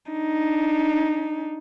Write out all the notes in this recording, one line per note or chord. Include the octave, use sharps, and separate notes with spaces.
D4 D#4